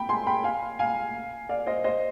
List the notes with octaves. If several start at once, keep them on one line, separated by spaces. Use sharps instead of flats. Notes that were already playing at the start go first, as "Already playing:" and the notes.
Already playing: G5 B5
G#5 C6
G5 B5
F5 G#5
F5 G#5
D5 F5
C5 D#5
C5 D#5